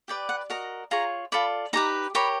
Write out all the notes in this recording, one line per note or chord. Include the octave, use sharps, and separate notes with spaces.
G4 B4 D5 G5
F#5
F#4 A#4 D#5 A#5
F4 G#4 C#5 A#5
F4 A4 D5 B5
D#4 G4 B4 A#5
G4 A#4 C#5 B5